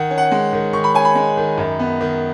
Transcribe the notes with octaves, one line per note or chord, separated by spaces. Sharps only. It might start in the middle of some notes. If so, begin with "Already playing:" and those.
Already playing: D#3 F#5
C#4
F#5
G#3
D#3
D#3 C#6
B5
C#4 G#5
B5
G#3
D#3
F#2
B3
D#3